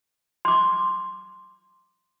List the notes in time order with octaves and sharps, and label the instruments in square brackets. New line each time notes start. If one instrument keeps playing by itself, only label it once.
[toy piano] C6 D6